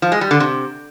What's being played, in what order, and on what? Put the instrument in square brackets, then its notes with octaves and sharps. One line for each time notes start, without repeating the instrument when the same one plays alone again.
[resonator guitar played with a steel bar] F3
G#3
G3
D3
C3